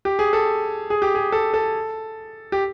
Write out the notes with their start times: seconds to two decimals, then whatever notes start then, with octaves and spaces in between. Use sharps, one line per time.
0.05 G4
0.19 G#4
0.33 A4
0.90 G#4
1.02 G4
1.15 G#4
1.32 A4
1.54 A4
2.52 G4